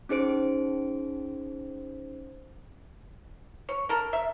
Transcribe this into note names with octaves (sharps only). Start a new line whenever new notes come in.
C#4 D#4 G#4 C5 D7
C#5
A4 A#4
E5